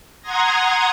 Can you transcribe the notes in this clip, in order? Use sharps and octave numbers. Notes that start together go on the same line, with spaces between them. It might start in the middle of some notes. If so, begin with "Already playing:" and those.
F#5 A#5 C6 D#6 G#6 A#6